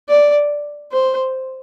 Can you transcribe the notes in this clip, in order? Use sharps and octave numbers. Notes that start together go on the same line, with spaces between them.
D5
C5